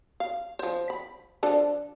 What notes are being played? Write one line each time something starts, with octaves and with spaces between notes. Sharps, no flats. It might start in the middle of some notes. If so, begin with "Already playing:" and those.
F5
F3 C5
B5
F3 D4 A4